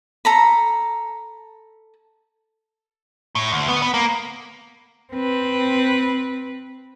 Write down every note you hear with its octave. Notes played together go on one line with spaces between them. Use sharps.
A4 A#5 B5
A2
D2
B3
B3
A#3
C4 B4